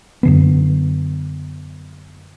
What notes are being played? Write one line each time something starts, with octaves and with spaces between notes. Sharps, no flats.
F#2 D3 B3